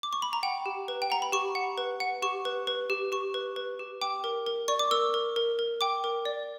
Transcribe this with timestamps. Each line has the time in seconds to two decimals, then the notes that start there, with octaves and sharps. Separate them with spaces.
0.03 D6
0.13 C#6
0.22 B5
0.33 A#5
0.43 F#5 G5
0.66 G4
0.88 B4
1.02 G5
1.10 F#5 A#5
1.22 B5
1.32 G4 C#6
1.55 F#5
1.78 B4
2.00 F#5
2.22 G4 C#6
2.45 B4
2.67 B4
2.90 G4
3.12 G4 C#6
3.34 B4
3.56 B4
3.79 G4
4.01 G5 D6
4.24 A#4
4.46 A#4
4.68 D5 C#6
4.79 D6
4.91 A#4 E6
5.14 A#4
5.36 A#4
5.59 A#4
5.81 G5 D6
6.04 A#4
6.25 D5